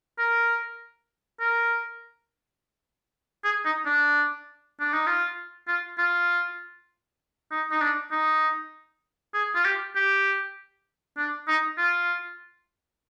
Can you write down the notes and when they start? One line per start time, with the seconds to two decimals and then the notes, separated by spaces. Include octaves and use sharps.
0.18 A#4
1.41 A#4
3.44 G#4
3.65 D#4
3.86 D4
4.80 D4
4.94 D#4
5.07 F4
5.68 F4
5.98 F4
7.52 D#4
7.72 D#4
7.82 D4
8.12 D#4
9.34 G#4
9.55 F4
9.65 G4
9.96 G4
11.17 D4
11.48 D#4
11.78 F4